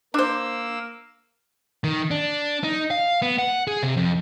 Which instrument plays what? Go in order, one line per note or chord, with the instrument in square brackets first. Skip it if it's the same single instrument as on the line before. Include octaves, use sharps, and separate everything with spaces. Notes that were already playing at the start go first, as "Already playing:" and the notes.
[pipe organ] A#3 E6 [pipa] D4 C5
[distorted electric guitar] D#3
D4
D#4
F5
B3
F#5
G#4
C3
F2